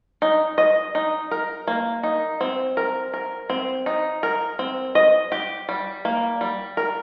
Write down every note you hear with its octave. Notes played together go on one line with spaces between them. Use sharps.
D#4
D#5
D#4
A#4
A#3
D#4
C4
A#4
A#4
C4
D#4
A#4
C4
D#5
G4
G3
A#3
G3
A#4